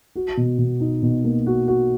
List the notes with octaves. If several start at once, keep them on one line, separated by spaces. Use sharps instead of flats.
F#4
B2
B2
D#4
B2
A#3
F#4
F#4